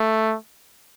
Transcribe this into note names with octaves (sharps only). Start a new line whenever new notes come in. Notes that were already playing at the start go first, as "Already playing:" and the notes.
Already playing: A3